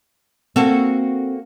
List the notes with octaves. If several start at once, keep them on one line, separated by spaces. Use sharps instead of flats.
A#3 C4 F#4 A4